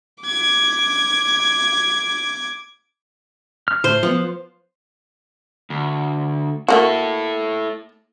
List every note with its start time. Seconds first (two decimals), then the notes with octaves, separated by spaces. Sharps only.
0.24 D6 G#6
3.68 F6
3.84 A2 C5
4.03 F3 B3
5.70 D2
6.68 A3 A#3 E4 F#4 A4